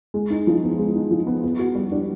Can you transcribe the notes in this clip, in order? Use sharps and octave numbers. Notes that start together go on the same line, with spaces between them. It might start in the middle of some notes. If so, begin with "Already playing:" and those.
G#3
D#4
F3
B3
G#3
D#4
F3
B3
B3
F#4
G3
D4